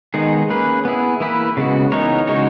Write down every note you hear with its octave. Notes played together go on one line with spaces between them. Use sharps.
D#3 G#3 B3 D#4 G#4
A#3 C#4 G#4 B4
B3 E4 G#4
E3 A#3 E4 B4
C#3 G#3 B3 F#4
E3 B3 D#4 A#4 C#5
C#3 G#3 D#4 F#4 C#5